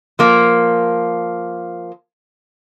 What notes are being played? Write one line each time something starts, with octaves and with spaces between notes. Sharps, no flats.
F3 A#3